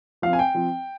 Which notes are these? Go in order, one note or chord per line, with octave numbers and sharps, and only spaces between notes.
F3 C4 F5
G#5
G5
F3 C4